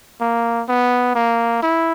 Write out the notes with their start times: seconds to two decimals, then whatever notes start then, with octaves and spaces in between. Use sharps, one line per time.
0.21 A#3
0.68 B3
1.15 A#3
1.63 E4